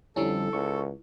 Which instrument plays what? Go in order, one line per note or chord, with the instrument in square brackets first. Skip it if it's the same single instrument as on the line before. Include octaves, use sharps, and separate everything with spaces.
[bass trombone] F2 [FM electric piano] D3 G3 C#4 [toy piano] E4 [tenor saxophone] A4
[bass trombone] C#2 [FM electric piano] C#6